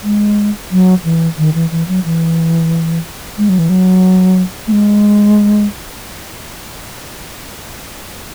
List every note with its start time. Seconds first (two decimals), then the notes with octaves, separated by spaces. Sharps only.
0.03 G#3
0.71 F#3
1.04 E3
1.38 D#3
1.54 E3
1.71 E3
1.88 F#3
2.05 E3
3.38 G#3
3.49 F#3
3.59 E3
3.69 F#3
4.67 A3
4.72 G#3